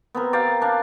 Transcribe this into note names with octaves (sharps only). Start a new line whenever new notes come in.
B3 C4 A#4
D5 F5 G5 A#5
D4 F5